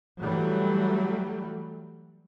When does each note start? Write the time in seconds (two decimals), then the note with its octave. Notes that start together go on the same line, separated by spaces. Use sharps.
0.20 E3 F#3 G3 A3